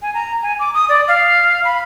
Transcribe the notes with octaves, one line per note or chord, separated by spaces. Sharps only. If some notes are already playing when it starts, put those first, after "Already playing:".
G#5
A#5
G#5
D6
D#6
D5
F5
B5